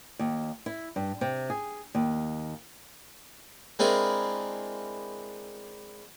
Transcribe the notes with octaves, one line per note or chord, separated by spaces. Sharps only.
D#2
E4
G2
C3
G#4
D#2
G#3 C4 D4 E4 G#4 A#4